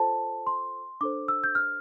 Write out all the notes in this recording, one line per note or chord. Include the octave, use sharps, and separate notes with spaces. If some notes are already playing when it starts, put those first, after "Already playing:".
Already playing: F4 A4 C5 A5
C6
D4 A4 C5 D6
E6
G6
F6